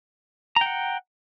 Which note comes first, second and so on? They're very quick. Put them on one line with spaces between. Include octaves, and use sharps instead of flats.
A#5 G5 F#5